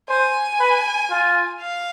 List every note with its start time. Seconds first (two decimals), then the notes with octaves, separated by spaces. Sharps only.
0.09 C5 G#5
0.60 B4
1.11 F4
1.61 F5